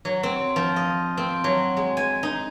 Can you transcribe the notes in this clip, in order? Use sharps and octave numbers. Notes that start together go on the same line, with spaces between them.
F#3
C4
F3
D#5
C4
F#3
G#3
G#5
D#4